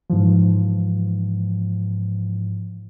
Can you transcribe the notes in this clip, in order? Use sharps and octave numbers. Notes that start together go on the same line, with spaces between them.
G#2 E3 F3